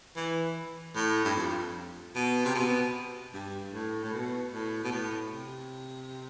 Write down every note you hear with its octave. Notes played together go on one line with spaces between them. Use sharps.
E3
A2
G2
F2
B2
C3
B2
G2
A2
A2
B2
A2
B2
A2
C3